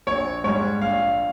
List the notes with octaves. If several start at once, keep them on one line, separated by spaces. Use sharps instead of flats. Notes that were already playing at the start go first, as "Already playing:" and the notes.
A#1 C#5
G#2 G3 C#5
A#1 F5